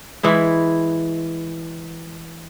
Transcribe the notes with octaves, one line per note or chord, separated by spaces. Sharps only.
E3 G#3 E4